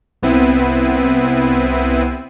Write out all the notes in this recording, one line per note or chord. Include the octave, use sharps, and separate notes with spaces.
C2 B3 C4 E4 D#7